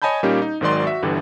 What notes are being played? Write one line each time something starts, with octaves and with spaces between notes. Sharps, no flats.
C#5 D#5 G#5 A5 B5 G6
A#2 G3 A#3 C#4 D#4 G4
D#4
G#1 G#2 D#3 F#3 D5 C6
F#4 E5
G1 D3 E3 G3